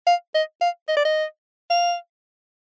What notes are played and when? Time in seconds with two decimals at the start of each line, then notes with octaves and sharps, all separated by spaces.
0.07 F5
0.34 D#5
0.61 F5
0.88 D#5
0.97 D5
1.05 D#5
1.70 F5